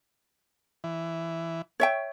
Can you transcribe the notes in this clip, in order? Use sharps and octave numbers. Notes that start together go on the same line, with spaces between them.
E3
C#5 E5 G5